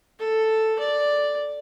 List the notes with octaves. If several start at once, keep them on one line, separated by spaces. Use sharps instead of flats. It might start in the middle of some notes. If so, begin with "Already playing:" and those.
A4
D5